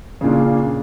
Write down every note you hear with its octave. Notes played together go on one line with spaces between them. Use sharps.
A#2 C#3 D4